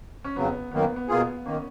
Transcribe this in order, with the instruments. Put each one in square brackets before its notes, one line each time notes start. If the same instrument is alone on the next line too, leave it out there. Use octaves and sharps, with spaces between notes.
[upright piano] C#4
[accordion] F2 C#3 F#3 [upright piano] B3
[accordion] F#2 D#3 A#3 [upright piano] B3
[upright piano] B3
B3
[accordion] B2 A#3 F4 G#4 [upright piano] B3
[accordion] D#3 A#3 [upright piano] C#4